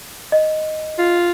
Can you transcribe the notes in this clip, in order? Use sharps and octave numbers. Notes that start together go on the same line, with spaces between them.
D#5
F4